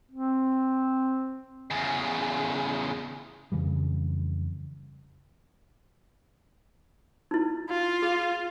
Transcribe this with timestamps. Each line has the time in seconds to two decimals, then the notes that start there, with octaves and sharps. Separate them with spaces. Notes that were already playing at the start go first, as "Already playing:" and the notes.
0.12 C4
1.71 E2 C#3
3.52 F2 C#3 E3 G3
7.31 D#4 E4
7.70 F4
8.02 G#4